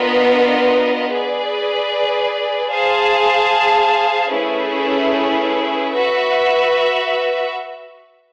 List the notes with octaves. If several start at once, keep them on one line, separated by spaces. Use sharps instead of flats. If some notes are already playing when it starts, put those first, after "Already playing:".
Already playing: B3 D4 F4 A#4 D#5
G#4 B4 D5
G#4 C5 F5 A5
A3 C#4 E4 G#4 B4
F#4 B4 E5